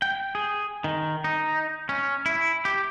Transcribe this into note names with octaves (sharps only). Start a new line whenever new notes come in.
G5
G#4
D#3
D#4
C#4
E4
G4